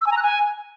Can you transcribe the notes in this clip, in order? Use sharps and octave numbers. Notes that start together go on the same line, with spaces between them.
E6
G#5
A#5
F#6
G#5